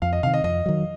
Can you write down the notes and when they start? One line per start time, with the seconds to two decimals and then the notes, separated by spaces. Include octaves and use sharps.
0.02 F2 F5
0.13 D#5
0.23 C3 F5
0.26 D#3
0.34 D#5
0.44 F2 D#5
0.66 D#3 F#3